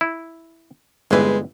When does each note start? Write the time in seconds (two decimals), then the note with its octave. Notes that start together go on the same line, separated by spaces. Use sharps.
0.01 E4
1.11 G1 E3 G#3 C4 B4